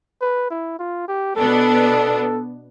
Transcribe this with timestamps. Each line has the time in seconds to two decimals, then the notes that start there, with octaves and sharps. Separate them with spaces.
0.22 B4
0.50 E4
0.79 F4
1.08 G4
1.36 B2 B3 D4 A4